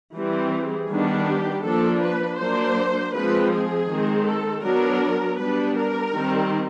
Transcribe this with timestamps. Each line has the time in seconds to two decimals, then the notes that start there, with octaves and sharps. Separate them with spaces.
0.14 E3 G3 C4
0.52 G#4
0.89 D#3 G3 B3 D4
1.26 G4
1.64 F3 A#3 D4 A4
2.01 B4
2.39 F#3 A#3 D4 C5
3.13 F3 G#3 C4 B4
3.51 G#4
3.89 D#3 G#3 C4
4.26 A4
4.63 F#3 B3 D4 A#4
5.38 G3 B3 D4 B4
5.76 A#4
6.13 D#3 G3 C4